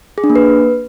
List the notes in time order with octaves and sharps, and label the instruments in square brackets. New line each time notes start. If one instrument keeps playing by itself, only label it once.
[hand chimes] G#4
D4
A#3
B4